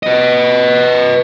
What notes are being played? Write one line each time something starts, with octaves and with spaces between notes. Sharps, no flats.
B4 D#5